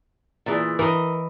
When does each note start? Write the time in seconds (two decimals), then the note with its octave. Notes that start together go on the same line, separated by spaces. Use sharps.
0.46 A#2 E3 G#4
0.79 E3 A#4 D#5